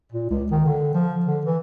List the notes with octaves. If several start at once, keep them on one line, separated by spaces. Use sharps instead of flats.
A#2
C#2
D#3
D3
F3
D3
E3